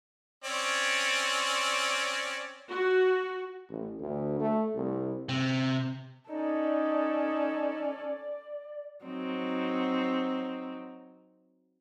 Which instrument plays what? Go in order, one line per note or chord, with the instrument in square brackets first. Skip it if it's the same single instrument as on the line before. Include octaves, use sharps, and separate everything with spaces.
[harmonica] C4 C#4 D5
[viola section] F#4
[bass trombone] A1
D2
A3
C2
[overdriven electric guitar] C3
[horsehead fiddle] C#4 A4 [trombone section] D#4 [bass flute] D5
[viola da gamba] F#3 C4 D#4